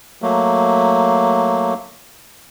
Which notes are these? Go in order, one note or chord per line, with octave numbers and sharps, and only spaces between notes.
F#3 A3 A#3